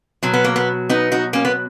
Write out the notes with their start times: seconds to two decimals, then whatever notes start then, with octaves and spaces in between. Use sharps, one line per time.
0.23 B2 F#3
0.33 B3
0.44 A#3
0.56 B3
0.89 B3 D#4
1.12 D#4 F#4
1.33 A#3 C#4
1.45 B3